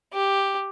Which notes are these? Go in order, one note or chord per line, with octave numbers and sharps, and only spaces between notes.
G4